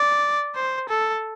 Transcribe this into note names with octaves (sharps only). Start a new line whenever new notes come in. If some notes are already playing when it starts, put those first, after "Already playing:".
Already playing: D5
C5
A4